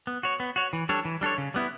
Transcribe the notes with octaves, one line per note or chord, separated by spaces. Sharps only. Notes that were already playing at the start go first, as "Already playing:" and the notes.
B3
F#4 C#5
B3
F#4 C#5
E3
G3 D4 A4 C#5
E3
G3 D4 A4 C#5
C#3
G3 B3 E4